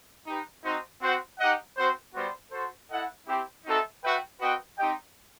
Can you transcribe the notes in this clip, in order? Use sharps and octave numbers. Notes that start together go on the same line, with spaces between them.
D#4 G4 B4
C4 D#4 F#4 C5
C4 F#4 C5 F#5
D#4 G4 D#5 F#5
C4 F#4 C5
G3 B3 F#4 C5
F#4 A4 C5
E4 A4 D#5 F#5
C4 E4 G4
C4 D#4 F#4 A4 E5
F#4 B4 E5 G5
C4 F#4 B4 D#5 G5
C4 D#4 G4 D#5 G5